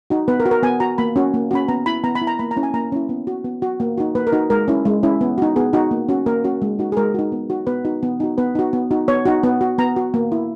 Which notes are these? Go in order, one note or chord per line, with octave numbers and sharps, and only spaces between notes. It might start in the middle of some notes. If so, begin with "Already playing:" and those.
D#4 F#4
B3 B4
A#4
F#4
A#4
B3 G#5
F#4 A#5
A#3 B5
C#4 F#4
A#3
C#4 F#4 B5
B3 A#5
E4 B5
B3 A#5
B5
E4
A#5
A#3 B5
A#5
C#4 E4
G#5
A#3 A#5
C#4 E4
B3
F#4
B3
F#4
A#3
D#4 F#4
A#3 B4
A#4
D#4 F#4
G#3 A#4
C#4 E4
G#3
C#4 E4
B3
D#4 F#4
B3 G#4
D#4 F#4
A#3
C#4 F#4
A#3 A#4
C#4 F#4
G#3
D#4 F#4
G#4
G#3 A#4
D#4 F#4
B3
D#4 F#4
B3 B4
D#4 F#4
B3
D#4 F#4
B3 B4
D#4 F#4
B3
D#4 F#4
B3 C#5
D#4 F#4
B3
F#4
B3 A#5
F#4
A#3
E4